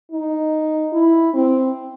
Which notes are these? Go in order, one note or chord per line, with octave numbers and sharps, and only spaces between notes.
D#4
E4
C4